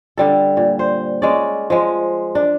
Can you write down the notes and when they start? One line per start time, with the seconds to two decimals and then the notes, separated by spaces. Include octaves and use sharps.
0.18 D3 G3 A4
0.57 A#2
0.79 C5
1.22 G#3 C#4 D5
1.70 F3 G#3
2.35 D4